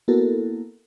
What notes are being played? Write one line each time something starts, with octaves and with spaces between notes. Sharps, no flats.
A#3 B3 E4 F#4 A4 A#4